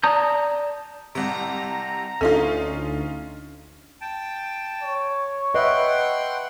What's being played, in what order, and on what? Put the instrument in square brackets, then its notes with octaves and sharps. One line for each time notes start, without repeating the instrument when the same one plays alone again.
[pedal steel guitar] D5 A5 A#5 D#6 G6
[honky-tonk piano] C2 C3 [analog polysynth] A#5
[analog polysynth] D2 [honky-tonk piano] C#4 D#4 F4 [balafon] A4
[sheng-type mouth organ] G5 A5
[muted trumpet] C#5
[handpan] B4 E5 [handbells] D#5 [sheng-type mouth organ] F#5 G5 C6